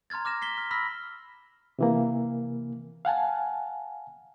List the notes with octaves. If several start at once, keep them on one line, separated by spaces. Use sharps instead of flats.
A#5 C6 F6 G#6 A6
D6 F6 A#6 E7
B6 C7 G7
F6
B5 E6 F6 A#6 B6
C3 E3 A#3
F5 F#5 G#5 A5